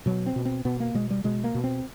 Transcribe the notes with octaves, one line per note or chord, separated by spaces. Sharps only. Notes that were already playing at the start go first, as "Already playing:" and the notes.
B2 F#3
C4
B2
C4
B2 B3
A#3
B2 G#3
G3
B2 G#3
A#3
B2
C4